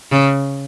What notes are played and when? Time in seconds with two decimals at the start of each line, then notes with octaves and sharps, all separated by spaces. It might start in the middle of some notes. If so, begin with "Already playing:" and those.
0.12 C#3